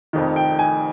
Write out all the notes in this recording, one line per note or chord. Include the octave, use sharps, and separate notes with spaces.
F1 F2 D#3
G5
G#5